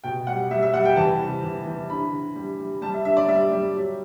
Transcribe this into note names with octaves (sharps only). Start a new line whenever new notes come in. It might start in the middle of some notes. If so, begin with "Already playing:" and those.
B2 G5
G3 F#5
G3 E5
E5
G3 F#5
G5
E3 A5
C3
E3
E3
D3 B5
D3
G3
G3
G3 A5
E5
D3 E5
D5
G3 E5
G3
F#3